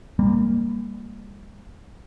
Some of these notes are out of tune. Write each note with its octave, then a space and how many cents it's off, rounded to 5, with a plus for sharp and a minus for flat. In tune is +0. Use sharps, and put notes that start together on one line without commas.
G3 +40 A#3 +0